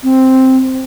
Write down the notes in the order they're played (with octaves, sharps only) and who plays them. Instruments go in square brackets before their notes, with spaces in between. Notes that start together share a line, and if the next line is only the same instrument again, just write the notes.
[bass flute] C4